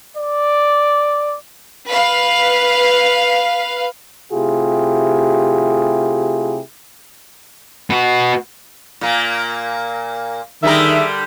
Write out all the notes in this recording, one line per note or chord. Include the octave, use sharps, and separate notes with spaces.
D5
B4 F5
C3 A3 E4 F4 G4 G#4
B3 F#4
A#2 A#3
D3 D#3 G3 G#4 A#4 E5